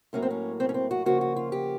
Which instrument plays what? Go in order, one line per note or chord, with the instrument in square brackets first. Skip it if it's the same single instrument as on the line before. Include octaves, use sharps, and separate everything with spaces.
[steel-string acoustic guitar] A2 F#3 A#3 C#4
C4
C#4
C4
C#4
C4
F#4
C#3 F3 A#3 F#4
F#4
F4
G4